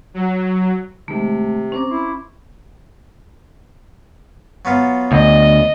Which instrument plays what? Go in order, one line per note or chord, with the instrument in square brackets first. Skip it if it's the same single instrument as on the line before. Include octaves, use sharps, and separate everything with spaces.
[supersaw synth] F#3
[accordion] C3 [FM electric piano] D#3 G#3 [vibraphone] A3
[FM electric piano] C4 C5 A#5 [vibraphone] C#4 C#6 D6
[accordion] E4 [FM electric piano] C6
[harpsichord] F#3 B3 F4
[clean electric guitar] D2 [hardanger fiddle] D#5